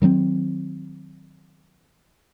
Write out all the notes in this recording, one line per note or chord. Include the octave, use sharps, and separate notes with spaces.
D#3 F#3 G#3 C4